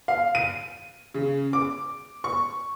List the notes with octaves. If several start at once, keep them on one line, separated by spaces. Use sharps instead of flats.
F5
D#7
C#3
D6
C#6